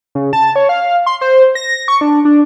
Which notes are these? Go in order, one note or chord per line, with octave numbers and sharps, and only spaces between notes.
C#3
A5
C#5
F5
C6
C5
A#6
C#6
D4
D4